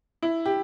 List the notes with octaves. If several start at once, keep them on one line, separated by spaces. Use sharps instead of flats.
E4
G4